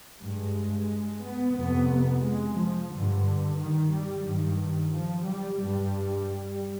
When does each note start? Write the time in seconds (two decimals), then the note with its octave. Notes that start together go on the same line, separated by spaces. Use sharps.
0.21 G2 G#3
1.24 B3
1.56 F2 C3 B3
1.91 B3
2.23 G#3
2.57 F3
2.92 G2 D3
3.59 D#3
3.92 G3
4.26 G2 D#3
4.93 F3
5.26 G3
5.60 G2 G3